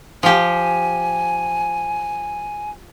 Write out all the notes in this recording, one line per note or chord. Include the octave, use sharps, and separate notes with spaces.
F3 G4 G#5